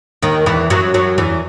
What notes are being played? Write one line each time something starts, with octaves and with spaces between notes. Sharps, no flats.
D#2 D#3
E2 E3
F#2 F#3
F#2 F#3
E2 E3